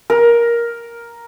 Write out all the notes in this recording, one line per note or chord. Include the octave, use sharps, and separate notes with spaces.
A#4